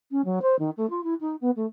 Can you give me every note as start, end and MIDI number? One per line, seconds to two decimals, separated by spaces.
0.11 0.22 61
0.25 0.39 54
0.42 0.58 72
0.59 0.70 51
0.77 0.89 57
0.90 1.03 65
1.04 1.14 64
1.21 1.36 63
1.41 1.51 59
1.56 1.66 57